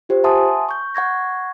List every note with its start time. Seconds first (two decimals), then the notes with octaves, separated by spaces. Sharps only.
0.09 F4 G4 C5
0.24 E5 F#5 G#5 A5 C6 D#6
0.69 C#6 G6
0.95 F#5 C#6 G#6 A#6